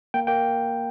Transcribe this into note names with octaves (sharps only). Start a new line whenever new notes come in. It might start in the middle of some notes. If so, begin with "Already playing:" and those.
A#3 G5
A#3 G5